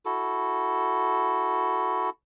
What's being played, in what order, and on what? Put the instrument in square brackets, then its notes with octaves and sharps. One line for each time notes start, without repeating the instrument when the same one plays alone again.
[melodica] E4 F#4 A4